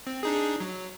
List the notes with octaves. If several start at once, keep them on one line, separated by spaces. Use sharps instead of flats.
C4
D4 D#4 G#4
F#3